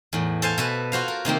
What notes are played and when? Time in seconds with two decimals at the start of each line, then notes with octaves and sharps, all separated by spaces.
0.13 E2 A2
0.42 A4 C5 F5 G#5
0.58 B2 A4 B4
0.92 F4 F#4 C5 F5
1.08 A#4
1.25 C3 D#3 A#3 C4